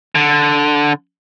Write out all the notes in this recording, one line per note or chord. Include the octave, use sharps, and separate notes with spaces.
D3